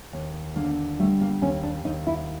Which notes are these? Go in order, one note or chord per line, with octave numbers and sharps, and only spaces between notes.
D#2
D3 A#3
G3 A3
A#3
D#2 C#4
D4
D#2 D#4
E4